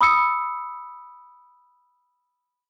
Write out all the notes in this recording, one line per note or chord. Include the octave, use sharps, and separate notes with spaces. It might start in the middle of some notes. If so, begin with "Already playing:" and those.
B5 D#6 E6 C#7